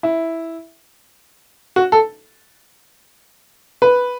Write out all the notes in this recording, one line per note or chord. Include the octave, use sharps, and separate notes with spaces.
E4
F#4
A4
B4